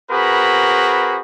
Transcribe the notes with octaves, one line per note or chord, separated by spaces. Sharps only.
C4 F#4 G#4 A#4 B4 B5